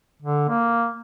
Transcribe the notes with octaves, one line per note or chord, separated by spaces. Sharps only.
D3
A#3